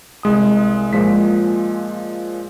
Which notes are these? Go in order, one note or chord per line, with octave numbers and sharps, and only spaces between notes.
C2 G#3 D#6
A#2 F3 G#3 B6